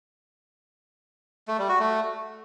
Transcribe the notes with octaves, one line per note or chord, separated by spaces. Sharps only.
A3
G3
F#4
A3